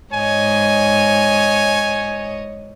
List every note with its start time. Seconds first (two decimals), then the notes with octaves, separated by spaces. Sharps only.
0.13 G#2 C#5 D#5 G#5